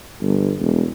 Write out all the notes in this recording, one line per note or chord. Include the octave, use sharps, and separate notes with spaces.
G1
E1